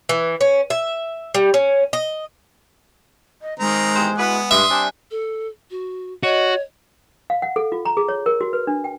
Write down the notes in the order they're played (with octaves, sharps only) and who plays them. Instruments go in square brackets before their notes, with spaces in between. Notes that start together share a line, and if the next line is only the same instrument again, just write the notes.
[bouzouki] E3
C#4
E5
G3
C#4
D#5
[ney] D#5
[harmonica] D#3 C4 A#5 [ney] G#3
[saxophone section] E2 G4 C5
[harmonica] B3 [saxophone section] E4 F#4 B4
[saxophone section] G2 [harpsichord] E5 [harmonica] C6 D#6
[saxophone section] G3 C4 D4 [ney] G#5
[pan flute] A4
F#4
[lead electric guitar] F#4 [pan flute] C#5 [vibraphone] D#5
[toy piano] F5
F#5
A4
F4
A#5
G#4
C#5
A#4
F#4
B4
D4
G5